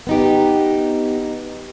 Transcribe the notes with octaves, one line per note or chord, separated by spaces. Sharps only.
B3 D#4 G4